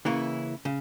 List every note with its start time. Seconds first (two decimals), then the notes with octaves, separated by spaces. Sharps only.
0.05 C#3 E3 A#3 C#4 E4
0.65 C#3